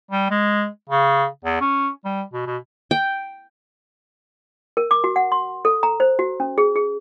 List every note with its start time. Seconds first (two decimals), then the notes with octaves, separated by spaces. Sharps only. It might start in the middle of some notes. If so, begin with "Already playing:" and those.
0.11 G3
0.31 G#3
0.90 C#3
1.45 E2
1.61 C#4
2.05 G3
2.33 B2
2.47 B2
2.91 G5
4.77 A#4
4.91 D6
5.04 F#4
5.16 F#5
5.32 C6
5.65 A4
5.83 A#5
6.00 C5
6.19 F#4
6.40 C#4
6.58 G#4
6.76 G#4